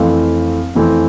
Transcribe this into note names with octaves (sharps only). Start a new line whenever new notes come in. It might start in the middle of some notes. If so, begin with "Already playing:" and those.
Already playing: F2 E3 A3 C4 F5
F2 E3 A3 C4